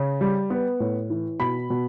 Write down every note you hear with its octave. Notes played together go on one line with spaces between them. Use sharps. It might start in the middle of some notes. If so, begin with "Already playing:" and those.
Already playing: C#3
G3
B3
A2
E3
B2 B5
B2